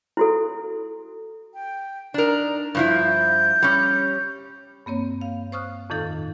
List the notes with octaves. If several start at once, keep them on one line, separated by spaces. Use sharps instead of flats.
E4 F#4 A4
G5
D4 D#4 A#4
G2 F3 E4 G6
G3 C#4
G2 A#3 C4 C#5
F5
C5 C#6 D#6 F6 F#6
F2 A2 D#3 D#4 A4 F5